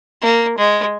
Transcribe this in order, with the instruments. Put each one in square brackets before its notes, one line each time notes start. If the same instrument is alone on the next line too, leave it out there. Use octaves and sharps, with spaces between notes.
[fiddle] A#3
G#3